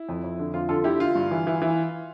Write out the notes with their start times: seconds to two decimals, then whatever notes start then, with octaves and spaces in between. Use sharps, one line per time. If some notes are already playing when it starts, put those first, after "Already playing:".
Already playing: E4
0.09 F2
0.24 F2
0.39 D3
0.53 F2 F4
0.69 D3 F4 A4
0.84 D3 E4 G4
1.00 D3 F4
1.15 G2
1.31 E3
1.47 E3
1.62 E3